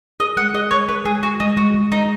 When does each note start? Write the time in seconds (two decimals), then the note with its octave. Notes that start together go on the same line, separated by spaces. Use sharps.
0.20 G#4 D#5
0.37 G#3 F#5
0.54 G#4 D#5
0.71 G#3 C#5
0.89 G#3 B4
1.05 G#3 G#4
1.23 G#3 F#4
1.40 G#3 D#4
1.57 G#3 F#4
1.74 G#3
1.91 G#3 D#4